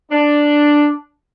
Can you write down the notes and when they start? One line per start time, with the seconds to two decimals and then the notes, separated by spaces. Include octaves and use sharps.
0.11 D4